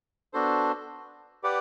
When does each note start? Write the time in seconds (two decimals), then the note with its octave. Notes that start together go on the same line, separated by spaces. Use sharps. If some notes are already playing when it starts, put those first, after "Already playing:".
0.33 B3 D4 F#4 A4 C5
1.43 G4 B4 D5 F#5